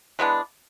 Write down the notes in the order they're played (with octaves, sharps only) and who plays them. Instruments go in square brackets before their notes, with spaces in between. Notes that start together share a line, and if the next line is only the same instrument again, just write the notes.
[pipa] E3 G#3 B3 D4